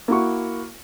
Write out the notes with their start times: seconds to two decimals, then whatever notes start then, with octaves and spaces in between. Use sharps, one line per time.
0.08 A#3 E4 F#4 C#6